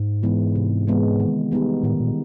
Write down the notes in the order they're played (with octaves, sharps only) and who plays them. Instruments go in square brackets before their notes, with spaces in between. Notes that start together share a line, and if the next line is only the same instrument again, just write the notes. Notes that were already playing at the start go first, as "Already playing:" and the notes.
Already playing: [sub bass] G#2
[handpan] E3 G#3 B3 E4
C3
E3 G#3 B3 E4
D#3
G3 B3 D#4 G4
[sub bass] A2 [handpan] D#3
[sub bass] A#2